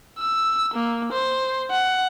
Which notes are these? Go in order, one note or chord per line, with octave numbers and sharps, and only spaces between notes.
E6
A#3
C5
F#5